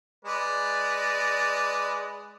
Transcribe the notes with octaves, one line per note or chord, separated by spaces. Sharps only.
G#3 B4 D5